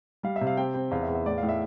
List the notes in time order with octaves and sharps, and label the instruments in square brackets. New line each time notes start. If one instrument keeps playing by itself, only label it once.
[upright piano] G3 F5
E5
C3
F5
C4 G5
C4
E2 F5
E5
E2
E5
A2 D5
A2 F5
E5